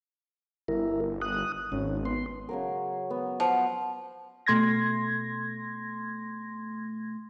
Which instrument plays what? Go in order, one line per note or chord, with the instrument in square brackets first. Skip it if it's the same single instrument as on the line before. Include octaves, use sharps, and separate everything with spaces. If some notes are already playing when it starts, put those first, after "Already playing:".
[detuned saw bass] G1 [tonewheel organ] E4 A#4
[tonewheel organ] D#6 F#6
[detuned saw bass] G#1 [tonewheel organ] C#4
[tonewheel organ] B3 C6
[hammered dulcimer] C#3 F#3 A#4
B3
[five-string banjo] F3 [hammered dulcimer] F#5
[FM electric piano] B2 A3 C6 G#6 A#6